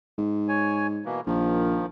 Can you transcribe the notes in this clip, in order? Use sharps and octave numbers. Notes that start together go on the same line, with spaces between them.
G#2
C#5 G#5
B2 E3 A#3
A#1 D#3 F3